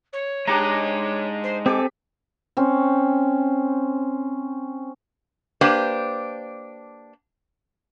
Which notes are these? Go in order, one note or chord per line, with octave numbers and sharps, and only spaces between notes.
C#5
G#3 D4 D#4 G4 A#5
C5
C4 G4 A4 G#5 D6
C4 C#4
A#3 D4 G4 B4 C5